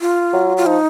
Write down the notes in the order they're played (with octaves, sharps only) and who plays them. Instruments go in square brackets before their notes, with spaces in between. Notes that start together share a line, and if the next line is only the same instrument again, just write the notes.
[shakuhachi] F4
[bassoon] F#3
[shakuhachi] F4
[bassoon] F3 [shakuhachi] D#4